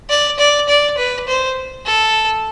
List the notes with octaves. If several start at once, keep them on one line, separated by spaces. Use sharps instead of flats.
D5
D5
D5
B4
C5
A4